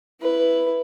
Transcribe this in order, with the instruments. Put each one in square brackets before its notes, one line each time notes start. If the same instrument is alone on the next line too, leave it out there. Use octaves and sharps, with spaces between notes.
[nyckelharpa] E4 B4